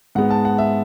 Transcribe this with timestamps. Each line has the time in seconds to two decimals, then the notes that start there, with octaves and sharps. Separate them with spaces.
0.15 G#2 G#3 B3 F#5
0.30 A5
0.45 F#5
0.58 E5